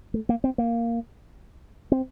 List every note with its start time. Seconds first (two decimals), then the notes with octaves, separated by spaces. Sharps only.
0.14 A3
0.29 A#3
0.44 C4
0.58 A#3
1.92 C4